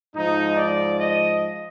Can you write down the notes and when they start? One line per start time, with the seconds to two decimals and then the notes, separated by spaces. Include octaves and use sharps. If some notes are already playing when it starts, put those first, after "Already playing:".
0.15 G#2 F3 D#4
0.57 D5
0.99 D#5